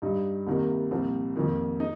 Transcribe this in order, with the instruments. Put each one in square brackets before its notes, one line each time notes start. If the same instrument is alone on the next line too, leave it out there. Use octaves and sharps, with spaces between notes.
[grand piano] G2 G3 D#4
C2 C3 D#3 A#3
C2 A#2 F3 C4
F2 D#3 A#3
D#4